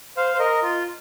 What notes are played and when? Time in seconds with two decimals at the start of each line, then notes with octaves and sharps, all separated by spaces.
0.17 C5 F5
0.34 C5
0.39 A#4 D#5
0.62 F4